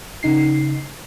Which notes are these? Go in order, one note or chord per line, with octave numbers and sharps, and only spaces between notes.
C#3 D#4 C7